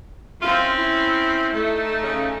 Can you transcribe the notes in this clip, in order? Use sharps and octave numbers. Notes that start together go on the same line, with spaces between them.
F#2 C4 C#4 E4 F4
E4
A3 D#4
C#3